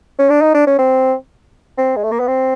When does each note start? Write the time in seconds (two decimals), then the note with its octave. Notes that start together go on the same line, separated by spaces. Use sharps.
0.19 C#4
0.29 D4
0.41 D#4
0.54 D4
0.66 C#4
0.78 C4
1.78 C4
1.96 G#3
2.03 A3
2.11 A#3
2.19 B3
2.27 C4